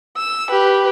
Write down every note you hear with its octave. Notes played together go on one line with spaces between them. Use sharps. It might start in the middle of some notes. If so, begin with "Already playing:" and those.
E6
G4 B4